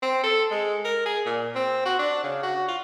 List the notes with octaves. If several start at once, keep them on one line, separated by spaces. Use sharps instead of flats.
C4
A4
G#3
A#4
G#4
A#2
C4
F#4
D4
C#3
F#4
F4